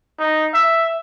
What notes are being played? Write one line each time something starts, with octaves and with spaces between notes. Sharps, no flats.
D#4
E5